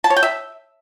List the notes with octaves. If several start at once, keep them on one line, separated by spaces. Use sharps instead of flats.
A5
C#5
G5
E5